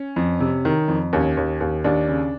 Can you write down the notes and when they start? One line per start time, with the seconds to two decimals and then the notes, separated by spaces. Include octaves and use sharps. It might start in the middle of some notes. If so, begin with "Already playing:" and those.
Already playing: C#4
0.16 F2
0.40 C3
0.65 D#3
0.88 F2
1.13 D#2 C#4
1.37 D#2
1.61 D#2
1.84 D#2 D4
2.08 C#3